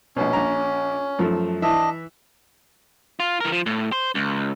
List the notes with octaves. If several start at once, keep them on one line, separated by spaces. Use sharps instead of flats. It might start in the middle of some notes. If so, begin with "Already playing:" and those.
A#1 B2 C#4
A#1 A#5
F#2 F3 A3
E3 D4 D#5 E5
F4
E3 A#4
F3
A2
C5
C#2